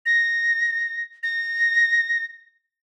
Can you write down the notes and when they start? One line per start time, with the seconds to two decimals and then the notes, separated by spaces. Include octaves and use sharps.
0.06 A#6
1.23 A#6